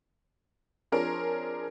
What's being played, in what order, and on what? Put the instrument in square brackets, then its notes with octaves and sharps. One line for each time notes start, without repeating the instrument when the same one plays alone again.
[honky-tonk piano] F3 C4 D4 G#4 A#4 C#5